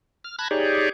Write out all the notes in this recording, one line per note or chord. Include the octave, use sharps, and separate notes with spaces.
F6
A5 B5 F#6 G#6 A#6
D#4 G4 G#4 C#5 D5